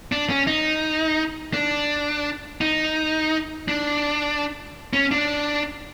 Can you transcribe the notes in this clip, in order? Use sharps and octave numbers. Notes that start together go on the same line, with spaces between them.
D4
C#4
D#4
D4
D#4
D4
C#4
D4